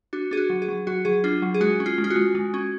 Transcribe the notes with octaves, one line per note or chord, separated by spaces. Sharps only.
D4 F#4
D4 G#4
F#4
F#3
G#4
F#3
F#3 F#4
F#3 G#4
D4 F4
F#3
G#4
G#3 F#4
C#4
F4
G#3
F4
F#4
G#3
G#3
C#4